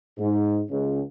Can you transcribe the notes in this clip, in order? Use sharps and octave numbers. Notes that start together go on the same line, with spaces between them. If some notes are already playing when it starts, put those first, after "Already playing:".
G#2
C#2